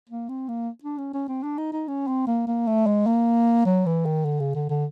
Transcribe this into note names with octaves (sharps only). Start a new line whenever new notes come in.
A#3
C4
A#3
D4
C#4
C#4
C4
D4
D#4
D#4
C#4
C4
A#3
A#3
A3
G#3
A#3
F#3
E3
D#3
D3
C#3
D3
D3